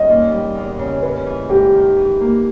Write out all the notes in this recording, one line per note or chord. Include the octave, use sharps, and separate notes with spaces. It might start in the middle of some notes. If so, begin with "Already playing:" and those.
Already playing: D#2 G3 C#4 D#5
A#2
G3
E2
C#3
C#3 B4
E3
G#2 G4
D#3
E3
A#3